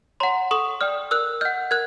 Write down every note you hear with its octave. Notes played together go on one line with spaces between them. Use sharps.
C#5 F#5 A#5 C6
A4 C#6 D#6
D5 G5 D#6 F6
A#4 E6 F#6
D#5 F#5 F6 G6
A#4 F#6 G#6